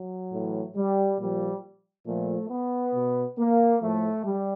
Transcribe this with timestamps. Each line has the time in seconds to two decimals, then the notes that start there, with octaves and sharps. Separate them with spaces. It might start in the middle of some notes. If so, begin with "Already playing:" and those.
Already playing: F#3
0.33 A2 E3
0.76 G3
1.19 A#2 F3 G3
2.06 A#2 F3 A3
2.49 B3
2.94 B2
3.38 A#3
3.81 A2 F3 A3
4.24 G3